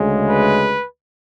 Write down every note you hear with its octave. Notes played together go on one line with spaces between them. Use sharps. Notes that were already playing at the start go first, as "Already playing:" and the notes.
Already playing: D2 C#3 G#3
B4